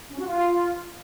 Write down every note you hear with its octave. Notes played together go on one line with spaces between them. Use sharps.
C#4
F#4
F4